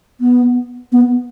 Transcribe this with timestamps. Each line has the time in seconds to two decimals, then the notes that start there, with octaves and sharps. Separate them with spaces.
0.21 B3
0.92 B3